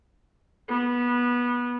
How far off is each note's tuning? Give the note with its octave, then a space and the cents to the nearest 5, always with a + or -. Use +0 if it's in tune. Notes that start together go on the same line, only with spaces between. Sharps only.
B3 -20